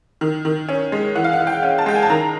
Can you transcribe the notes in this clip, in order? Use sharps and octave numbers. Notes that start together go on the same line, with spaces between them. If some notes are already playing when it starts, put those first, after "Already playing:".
D#3
D#3
C#4
G#3
E3 F#5
F5
F#5
E3
G5
C#4
A5
G#3 G5
G#5
A5
D#3 A#5